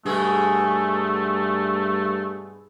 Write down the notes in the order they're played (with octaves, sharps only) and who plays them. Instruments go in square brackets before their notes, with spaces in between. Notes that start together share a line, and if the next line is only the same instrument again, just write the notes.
[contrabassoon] G2 [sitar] B2 G#3 G#4 [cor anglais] A3